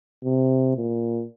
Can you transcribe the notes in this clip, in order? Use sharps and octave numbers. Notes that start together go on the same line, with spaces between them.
C3
A#2